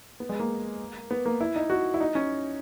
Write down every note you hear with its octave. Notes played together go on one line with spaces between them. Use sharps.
B3
G#3
A#3
B3
A#3
E4
D#4
F#4
E4
D#4
C#4